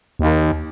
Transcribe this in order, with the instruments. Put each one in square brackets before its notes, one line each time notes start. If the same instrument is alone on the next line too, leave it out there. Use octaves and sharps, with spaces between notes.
[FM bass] D#2